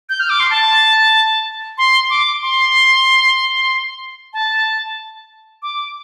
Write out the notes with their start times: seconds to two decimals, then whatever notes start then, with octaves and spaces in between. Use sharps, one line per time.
0.09 G6
0.20 F6
0.30 D6
0.40 C6
0.50 A5
1.78 C6
2.10 D6
2.42 C6
4.33 A5
5.62 D6